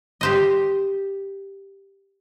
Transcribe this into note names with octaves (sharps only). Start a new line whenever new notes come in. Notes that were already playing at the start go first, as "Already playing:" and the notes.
G4 C5 D#5